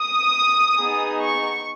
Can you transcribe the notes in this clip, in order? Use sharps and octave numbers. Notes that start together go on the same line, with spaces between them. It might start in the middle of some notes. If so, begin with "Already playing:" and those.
Already playing: D#6
B3 D#4 G#4
C#6